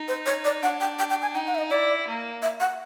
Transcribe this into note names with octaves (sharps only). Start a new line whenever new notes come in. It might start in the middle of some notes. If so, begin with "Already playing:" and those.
Already playing: D#4
C5
C#5
D5
D4 F#5
G5
G5
G5
G#5
D#4 G5
F#5
E5
D#5
E4 D5
A#3
E5
F#5